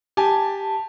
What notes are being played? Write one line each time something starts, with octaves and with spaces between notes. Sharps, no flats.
G4 G#5 A5